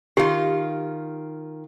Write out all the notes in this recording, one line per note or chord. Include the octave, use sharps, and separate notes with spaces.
D#3 F4 G4